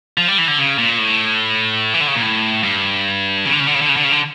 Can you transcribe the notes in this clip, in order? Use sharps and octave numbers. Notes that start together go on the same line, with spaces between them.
F3
G3
E3
D3
C#3
A#2
A2
E3
D3
C#3
A#2
A2
G2
C#3
D3
C#3
D3
C#3
D3
C#3
D3
C#3
D3